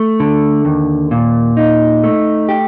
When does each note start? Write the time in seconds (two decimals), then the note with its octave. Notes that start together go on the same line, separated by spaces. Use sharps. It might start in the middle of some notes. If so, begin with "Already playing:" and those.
Already playing: A3
0.20 D3
0.65 D#2
1.11 A#2
1.57 D#4
2.03 A3
2.49 G4